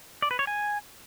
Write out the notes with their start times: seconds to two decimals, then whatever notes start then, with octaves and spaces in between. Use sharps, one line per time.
0.22 D5
0.31 B4
0.39 C#5
0.47 G#5